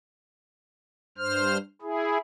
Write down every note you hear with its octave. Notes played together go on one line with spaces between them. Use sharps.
G2 C5 F6
E4 G#4